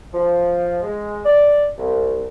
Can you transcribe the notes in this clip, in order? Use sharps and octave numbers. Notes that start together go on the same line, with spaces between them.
F3
G#3
D5
C2